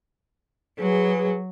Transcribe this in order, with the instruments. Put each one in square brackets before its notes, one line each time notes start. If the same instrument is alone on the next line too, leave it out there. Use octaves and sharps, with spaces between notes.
[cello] F#3 [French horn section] G#4 B4